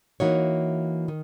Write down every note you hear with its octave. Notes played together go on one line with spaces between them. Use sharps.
E3 A#3 D#4 F#4 C#5
D#3